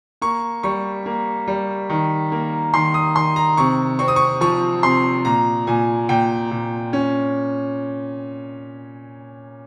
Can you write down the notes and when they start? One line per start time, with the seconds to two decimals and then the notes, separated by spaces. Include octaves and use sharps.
0.21 A#3 C#6
0.63 G3 C#6
1.06 A#3
1.47 G3
1.90 D#3
2.32 A#3
2.73 D#3 C6
2.94 D#6
3.16 D#3 C6
3.36 A#5
3.57 C3 C#6
3.99 C4 C#6
4.08 D#6
4.16 C#6
4.41 F3 C#6
4.83 C3 C6
5.25 A#2 A#5
5.67 A#2 G#5
6.09 A#2 G5
6.51 A#2
6.93 C#4